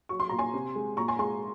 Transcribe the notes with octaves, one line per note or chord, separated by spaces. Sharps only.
F#3 C#6
C6
A#2 A#5
G#5 C6
C3
G#3
A#2 A#5 C#6
G#5 C6
G#3 G#5 C6